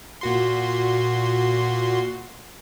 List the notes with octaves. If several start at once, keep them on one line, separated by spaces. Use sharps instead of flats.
A#2 F#4 C6